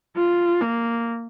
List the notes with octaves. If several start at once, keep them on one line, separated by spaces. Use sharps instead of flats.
F4
A#3